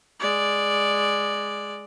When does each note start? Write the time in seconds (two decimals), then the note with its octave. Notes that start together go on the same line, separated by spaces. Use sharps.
0.20 G#3 D5